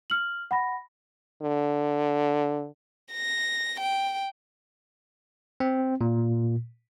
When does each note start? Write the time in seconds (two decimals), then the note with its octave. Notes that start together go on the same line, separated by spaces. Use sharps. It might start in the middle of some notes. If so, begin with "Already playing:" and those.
0.10 F6 F#7
0.51 F#5 B5 A#6
1.42 D3
3.13 A#6
3.80 G5
5.60 C4
6.01 A#2